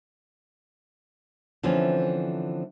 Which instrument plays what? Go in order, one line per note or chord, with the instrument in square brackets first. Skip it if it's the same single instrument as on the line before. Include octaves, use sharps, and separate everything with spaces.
[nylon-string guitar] D3 E3 F3 A3 C4 C#4